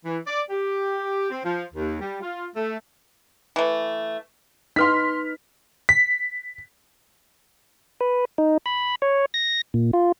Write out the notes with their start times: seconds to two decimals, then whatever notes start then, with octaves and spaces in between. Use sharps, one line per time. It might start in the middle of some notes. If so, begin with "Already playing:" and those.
0.05 E3
0.26 D5
0.50 G4
1.30 C4
1.45 F3
1.74 D#2
2.00 G3
2.21 F4
2.55 A3
3.56 E3 A3
4.76 D#4 B4 C6 F6 B6
5.89 B6
8.01 B4
8.38 D#4
8.66 B5
9.02 C#5
9.34 A#6
9.74 A#2
9.93 F4